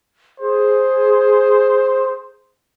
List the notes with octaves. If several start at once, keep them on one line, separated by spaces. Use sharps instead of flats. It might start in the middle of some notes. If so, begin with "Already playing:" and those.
G#4 C5